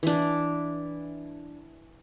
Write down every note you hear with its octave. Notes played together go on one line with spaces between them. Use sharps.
E3 D4